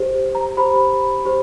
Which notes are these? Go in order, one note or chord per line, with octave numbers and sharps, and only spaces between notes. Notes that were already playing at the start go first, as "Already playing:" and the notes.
Already playing: G4 C5
A#5
G4 C5 B5
G4 C5